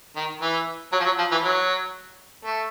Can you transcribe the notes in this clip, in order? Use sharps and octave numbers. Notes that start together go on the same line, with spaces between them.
D#3
E3
F#3
F3
F#3
F3
E3
F#3
A3